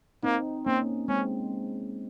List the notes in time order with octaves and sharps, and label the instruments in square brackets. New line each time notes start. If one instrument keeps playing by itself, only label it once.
[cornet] A#3 [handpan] C4 D#4
[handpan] A#3 C#4 [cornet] C4
[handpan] G#3 C4 [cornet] C#4